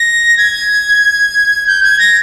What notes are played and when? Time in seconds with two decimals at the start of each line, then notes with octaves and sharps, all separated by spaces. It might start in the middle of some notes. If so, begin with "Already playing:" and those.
Already playing: A#6
0.38 G#6
1.67 G6
1.83 G#6
1.99 A#6